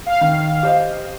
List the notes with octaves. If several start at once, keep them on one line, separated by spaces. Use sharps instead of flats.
F5
D#3
G4 C5 D#5